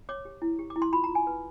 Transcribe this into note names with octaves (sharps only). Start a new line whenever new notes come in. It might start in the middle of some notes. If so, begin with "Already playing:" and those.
C#5 D6
G4
E4
G4
D6
E4
C6
F4 B5
A#5
F4
G#5
B4